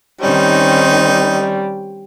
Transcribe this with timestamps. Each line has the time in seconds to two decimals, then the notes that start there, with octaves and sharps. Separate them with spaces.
0.21 D#3 G3 C4 C#4 D#4